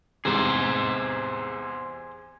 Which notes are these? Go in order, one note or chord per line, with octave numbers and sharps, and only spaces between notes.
E2 G#2 C3 G#4 C5